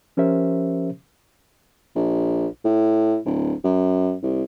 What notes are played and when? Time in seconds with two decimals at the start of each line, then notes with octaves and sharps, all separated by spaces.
0.17 F3 C#4 G4 A#4 C5 E5
1.96 A#1
2.65 A2
3.26 D1
3.64 F#2
4.23 C2